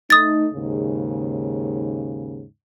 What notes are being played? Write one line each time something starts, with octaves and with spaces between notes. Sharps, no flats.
A3 D#4 D#6 A6
D#2 G#2 C#3